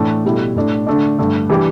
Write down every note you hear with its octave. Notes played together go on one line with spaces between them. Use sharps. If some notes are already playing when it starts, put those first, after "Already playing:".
Already playing: A2 E3 A3 D4
B2 G3 E4 A4
A2 A3 D4
D3 A3 D4
G2 D3 A3
E3 G3 D4 G4